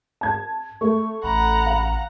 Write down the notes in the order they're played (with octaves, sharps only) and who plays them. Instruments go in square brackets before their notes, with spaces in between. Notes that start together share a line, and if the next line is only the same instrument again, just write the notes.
[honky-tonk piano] A5 G#6
[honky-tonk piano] A3 [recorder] C#6
[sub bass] A1 [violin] F#5 A#5 [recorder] B5
[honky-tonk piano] F5